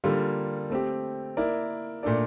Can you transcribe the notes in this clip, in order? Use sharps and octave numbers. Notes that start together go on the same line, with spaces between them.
D3 G3 A#3 F4 A4
A3 C4 G4
A#3 E4 A#4 D5
A#2 A3 D4 A4 D5